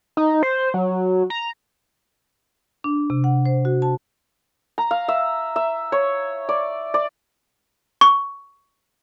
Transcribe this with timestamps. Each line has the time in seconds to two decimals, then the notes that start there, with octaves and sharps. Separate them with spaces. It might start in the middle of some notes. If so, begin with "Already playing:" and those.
0.17 D#4
0.43 C5
0.74 F#3
1.30 A#5
2.84 D4
3.10 C3
3.24 F#5
3.45 C5
3.65 F#4
3.82 A5
4.78 A#5
4.91 F5
5.08 E5
5.56 E5
5.92 C#5
6.49 D5
6.94 D5
8.01 C#6